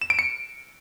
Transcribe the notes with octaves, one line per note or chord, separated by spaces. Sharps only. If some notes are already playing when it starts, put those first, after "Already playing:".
E7
D7
C#7